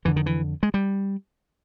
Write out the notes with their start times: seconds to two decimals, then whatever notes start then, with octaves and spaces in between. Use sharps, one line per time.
0.05 F2 D3 E3
0.16 D#3
0.26 E3
0.63 G#3
0.74 G3